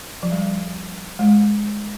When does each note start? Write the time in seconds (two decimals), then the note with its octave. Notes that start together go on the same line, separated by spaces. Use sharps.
0.23 F3
0.32 G3
1.19 G#3